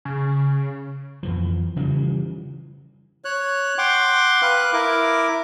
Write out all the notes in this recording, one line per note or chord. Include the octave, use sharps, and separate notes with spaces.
C#3
F2 E3 F3
C#3 E3 F3 G3
C#5 F#6
F#5 G5 C6 D6
B4 F5 F#6
E4 A#4 D6